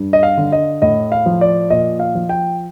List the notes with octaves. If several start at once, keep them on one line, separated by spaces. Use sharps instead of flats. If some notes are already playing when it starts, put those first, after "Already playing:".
Already playing: G2
D#5
F5
D3
D#5
A2 D#5
F5
F3
D5
A#2 D#5
F5
F3
G5